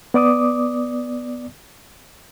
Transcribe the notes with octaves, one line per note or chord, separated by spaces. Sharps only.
B3 D5 D6 D#6